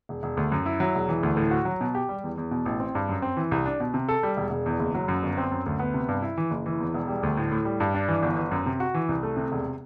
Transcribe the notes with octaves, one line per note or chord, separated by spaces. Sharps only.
E1
E1
D2
F#2
E4
F#3
E1
E3
D2
A2
F#4
F#3
B2
G4
G3
E2
E2
B2
A1
C4
G2
F#2
C4
E3
C2
D4
B2
C3
A4
G3
E1
E1
E2
F#1
F#3
F#2
G1
C4
F#2
D2
B3
C3
G2
E4
E3
F#1
E3
E2
E1
G3
D2
A2
A2
G3
G2
D4
E3
G1
G1
F#2
C3
F#4
E3
C2
A3
C3
E1